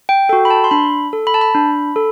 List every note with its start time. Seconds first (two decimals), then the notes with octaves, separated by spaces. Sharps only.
0.09 G5
0.29 F#4 A4 G5
0.45 B5
0.50 A5
0.64 C6
0.71 D4 B5
1.13 A4
1.27 B5
1.34 A5
1.41 B5
1.55 D4
1.96 A4